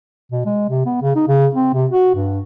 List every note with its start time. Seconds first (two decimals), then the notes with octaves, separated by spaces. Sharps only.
0.32 B2
0.46 G#3
0.69 C3
0.86 B3
1.02 C#3
1.16 D#4
1.28 C#3
1.55 C4
1.74 C3
1.91 F#4
2.15 G2